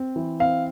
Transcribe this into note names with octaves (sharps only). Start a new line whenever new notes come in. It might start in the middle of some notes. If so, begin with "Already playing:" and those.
Already playing: C4
E3
C4 F5